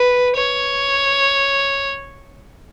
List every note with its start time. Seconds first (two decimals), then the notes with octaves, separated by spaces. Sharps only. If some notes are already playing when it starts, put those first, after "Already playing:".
Already playing: B4
0.37 C#5